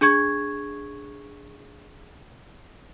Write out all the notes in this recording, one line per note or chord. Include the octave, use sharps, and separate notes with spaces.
D4 G#4 C#6 G#6